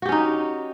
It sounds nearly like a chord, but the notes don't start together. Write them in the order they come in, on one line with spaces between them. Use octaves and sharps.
F#4 G4 C#4 D#4